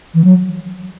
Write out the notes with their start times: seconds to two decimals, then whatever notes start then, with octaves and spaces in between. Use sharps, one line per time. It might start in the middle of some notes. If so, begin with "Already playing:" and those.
0.14 E3
0.24 F#3